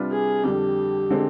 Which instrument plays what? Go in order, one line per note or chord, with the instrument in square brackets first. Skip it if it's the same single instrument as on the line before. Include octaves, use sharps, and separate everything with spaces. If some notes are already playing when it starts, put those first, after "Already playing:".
Already playing: [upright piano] C3 G3 D4 F4 B4
[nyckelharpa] G#4
[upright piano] F2 D3 G3 [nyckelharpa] G4
[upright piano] D3 G#3 C4